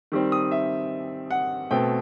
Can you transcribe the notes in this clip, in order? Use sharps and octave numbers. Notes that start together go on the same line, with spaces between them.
D#3 G3 C4
D#6
E5
F#5
B2 A3 C4 G5